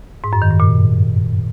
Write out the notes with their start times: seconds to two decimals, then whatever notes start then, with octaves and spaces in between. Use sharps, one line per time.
0.24 G#2
0.33 F#2
0.42 D#3
0.51 G2
0.60 A#2